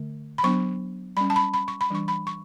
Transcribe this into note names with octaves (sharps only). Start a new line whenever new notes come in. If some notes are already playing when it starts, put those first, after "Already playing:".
Already playing: D3 A3
B5
F#3 B3 D4 C#6
G3 C#4 B5
A5
B5
B5
C#6
B5
E3 G3 D4 C#6
B5
C#6